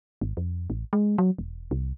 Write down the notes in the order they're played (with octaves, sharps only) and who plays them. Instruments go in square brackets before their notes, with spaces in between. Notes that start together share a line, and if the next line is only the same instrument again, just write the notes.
[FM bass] G#1
F2
A1
G#3
F#3
E1
C2